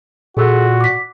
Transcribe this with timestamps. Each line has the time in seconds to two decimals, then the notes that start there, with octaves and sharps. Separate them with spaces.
0.37 A#2 F#4 G#4 A4 E6
0.81 D6 B6